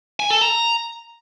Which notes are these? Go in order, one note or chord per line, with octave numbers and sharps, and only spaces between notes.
G#5
A4
A#5